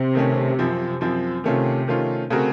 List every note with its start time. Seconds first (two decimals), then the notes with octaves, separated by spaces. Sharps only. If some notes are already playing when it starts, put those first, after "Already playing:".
Already playing: C3
0.15 D#3 A3 C#4
0.59 F#2 F3 C4
1.01 F#2 F3 C4
1.44 C3 D#3 A3 C#4 F4
1.88 D#3 A3 C#4 F4
2.30 C#3 A3 C4 F#4 A#4